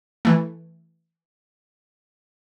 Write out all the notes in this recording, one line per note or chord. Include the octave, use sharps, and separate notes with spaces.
E3 A3